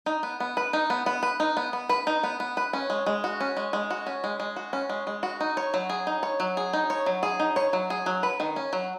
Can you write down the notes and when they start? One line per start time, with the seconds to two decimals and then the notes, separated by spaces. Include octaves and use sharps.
0.06 D#4
0.23 B3
0.40 B3
0.57 B4
0.73 D#4
0.90 B3
1.06 B3
1.23 B4
1.40 D#4
1.57 B3
1.73 B3
1.89 B4
2.07 D#4
2.23 B3
2.40 B3
2.57 B4
2.73 C#4
2.90 G#3
3.06 G#3
3.24 F#4
3.40 C#4
3.57 G#3
3.73 G#3
3.90 F#4
4.06 C#4
4.24 G#3
4.40 G#3
4.56 F#4
4.73 C#4
4.89 G#3
5.07 G#3
5.23 F#4
5.41 D#4
5.57 C#5
5.74 F#3
5.90 G#4
6.07 D#4
6.23 C#5
6.40 F#3
6.57 G#4
6.73 D#4
6.90 C#5
7.06 F#3
7.23 G#4
7.40 D#4
7.56 C#5
7.73 F#3
7.90 G#4
8.06 F#3
8.23 B4
8.40 D#3
8.56 C#4
8.73 F#3